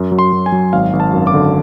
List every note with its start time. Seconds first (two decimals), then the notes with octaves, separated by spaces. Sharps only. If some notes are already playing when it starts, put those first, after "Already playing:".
Already playing: F#2
0.12 F#3
0.19 C6
0.33 F#2
0.46 G#5
0.52 F#3
0.73 G#1 F5
0.93 G#1
1.00 A5
1.13 F#2
1.27 D6
1.34 D3